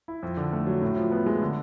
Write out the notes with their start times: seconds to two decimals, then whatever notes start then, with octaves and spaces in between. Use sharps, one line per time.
0.08 E4
0.23 F2
0.37 D3
0.53 A3
0.67 F#3
0.82 A2
0.96 F3
1.12 B3
1.26 G#3
1.42 D3